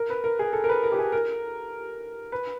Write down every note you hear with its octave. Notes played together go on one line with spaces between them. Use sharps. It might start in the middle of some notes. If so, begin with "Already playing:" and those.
Already playing: A#4
B4
A#4
G#4
A4
A#4
B4
A#4
G4
G#4
A#4
B4